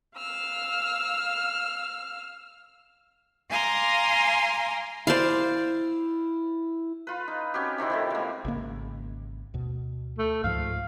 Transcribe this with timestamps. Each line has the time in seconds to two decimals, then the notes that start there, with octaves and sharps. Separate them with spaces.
0.18 F5 E6 F6
3.49 F5 G#5 A#5 C6 D6
5.07 E4 C5 D5 F5
7.07 F4 B4
7.28 D#4
7.54 C4 C#4 F#4 G4
7.78 C3 D#3 C4 E4
7.90 A2 C3 F3
8.10 G#3 A#3
8.45 G#1 C#3 A#3
9.54 D2 B2
10.18 A3
10.44 C#2 G#2 F3 F5